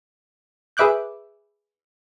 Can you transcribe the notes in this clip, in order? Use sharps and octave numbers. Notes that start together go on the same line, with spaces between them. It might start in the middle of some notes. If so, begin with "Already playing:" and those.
G#4 B4 E5 D6 F#6 G6